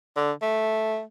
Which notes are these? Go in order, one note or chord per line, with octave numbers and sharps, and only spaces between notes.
D3
A3